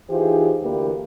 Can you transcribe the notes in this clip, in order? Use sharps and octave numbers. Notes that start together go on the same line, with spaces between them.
E3 D#4 F4 G4 G#4 C5
D2 E3 A#3 G4 B4